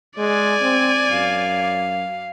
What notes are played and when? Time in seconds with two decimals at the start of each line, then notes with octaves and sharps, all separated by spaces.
0.18 G#3 D5 G#5
0.62 C4
1.11 F#2 F5